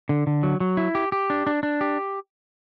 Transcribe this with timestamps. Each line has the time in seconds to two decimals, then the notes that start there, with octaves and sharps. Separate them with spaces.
0.09 D3
0.27 D3
0.43 F#3
0.60 F#3
0.77 E4
0.95 G4
1.12 G4
1.30 D4
1.47 D4
1.63 D4
1.81 G4